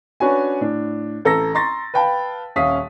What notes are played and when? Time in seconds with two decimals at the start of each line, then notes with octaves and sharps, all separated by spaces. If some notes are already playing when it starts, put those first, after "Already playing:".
0.20 C#4 D4 F#4 B4 C#5 G#5
0.61 A2 D4
1.25 A1 A4 A#5 E6 A#6
1.55 A#5 C6 C#6 A6 A#6
1.94 B4 F5 G5 A5 B5
2.56 D#1 C#4 E5 F5 D#6 B6